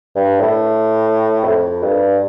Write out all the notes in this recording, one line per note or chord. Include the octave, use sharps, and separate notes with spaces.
G2
A2
F2
G2